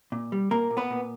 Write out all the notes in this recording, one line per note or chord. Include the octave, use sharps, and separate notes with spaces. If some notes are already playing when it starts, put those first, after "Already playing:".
A#2
G3
A#2 A#3 A#4
A#2
B3 B4
A#2